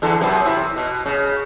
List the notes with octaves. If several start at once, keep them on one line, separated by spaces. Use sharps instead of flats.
E2 D3 A4
F#2 C3 B3
C3 E4
B2
C#3